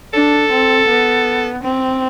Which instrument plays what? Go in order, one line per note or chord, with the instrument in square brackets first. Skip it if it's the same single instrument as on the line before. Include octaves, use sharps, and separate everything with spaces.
[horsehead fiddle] D4 [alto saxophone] A4
[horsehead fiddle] C4
B3
C4